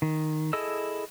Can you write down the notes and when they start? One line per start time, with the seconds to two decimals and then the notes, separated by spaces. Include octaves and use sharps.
0.02 D#3
0.53 E4 G#4 A4 D#5 E6